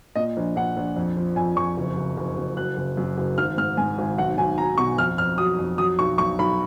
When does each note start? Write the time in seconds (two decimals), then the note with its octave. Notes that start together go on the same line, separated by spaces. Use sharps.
0.16 A#2 D#5
0.37 A#1
0.56 A#1 F#5
0.77 A#1
0.96 F2
1.17 F3
1.36 F2 G#5
1.56 F2 C#6
1.77 F#1
1.97 F#1
2.17 F#1
2.37 F#1
2.57 F#3 F#6
2.77 F#1
2.97 F#2
3.17 F#1
3.38 G#1 F6
3.58 G#2 F6
3.77 G#2 G#5
3.98 G#1
4.18 B1 F#5
4.38 B1 G#5
4.58 F#3 A#5
4.78 B2 C#6
4.98 F2 F6
5.18 F2 F6
5.38 F#3 D#6
5.59 F2
5.78 F#3 D#6
5.99 B1 C#6
6.18 B1 C#6
6.39 B1 B5